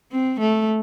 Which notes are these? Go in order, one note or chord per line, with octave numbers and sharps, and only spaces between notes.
C4
A3